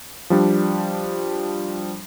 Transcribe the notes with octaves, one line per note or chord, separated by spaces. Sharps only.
F3 G3 D4